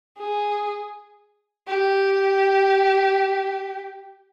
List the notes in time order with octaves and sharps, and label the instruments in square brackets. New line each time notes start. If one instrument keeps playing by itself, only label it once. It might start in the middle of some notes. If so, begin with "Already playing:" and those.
[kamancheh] G#4
G4